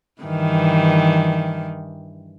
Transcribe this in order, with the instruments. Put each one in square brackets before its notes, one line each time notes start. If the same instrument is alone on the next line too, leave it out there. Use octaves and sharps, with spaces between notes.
[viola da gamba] G2 D#3 E3